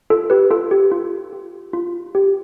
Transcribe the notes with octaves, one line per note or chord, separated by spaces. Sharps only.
F4 A4
G4 B4
F4 A4
G4
F4
G4
F4
G4